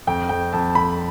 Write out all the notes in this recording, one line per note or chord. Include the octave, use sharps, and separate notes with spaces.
F2 G5
F2 G5
F2 A5
F2 B5